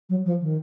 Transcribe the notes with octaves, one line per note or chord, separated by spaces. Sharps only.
F#3
F3
D#3